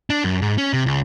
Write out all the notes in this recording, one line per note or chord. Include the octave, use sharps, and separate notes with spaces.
D4
F#2
G#2
C#4
C3
C#2